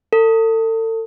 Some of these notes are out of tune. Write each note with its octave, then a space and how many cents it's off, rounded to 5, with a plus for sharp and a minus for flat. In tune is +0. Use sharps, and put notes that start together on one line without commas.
A4 +35